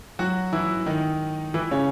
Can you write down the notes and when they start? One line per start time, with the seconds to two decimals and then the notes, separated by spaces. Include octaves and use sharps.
0.19 F#3 F#4
0.53 E3 E4
0.86 D#3 D#4
1.54 E3 E4
1.71 C#3 C#4